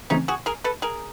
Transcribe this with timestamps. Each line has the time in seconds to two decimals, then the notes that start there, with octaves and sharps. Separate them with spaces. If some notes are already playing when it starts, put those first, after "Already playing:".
0.10 C#3 E3 A3 C4 C#4 D#4
0.28 F#4 G#4
0.46 G#4 A#4
0.64 A4 B4
0.82 G#4 A#4